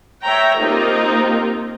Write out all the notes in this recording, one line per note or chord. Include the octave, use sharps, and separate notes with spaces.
C#5 E5 G5 A#5
A#3 C4 D#4 F4 G4 A#4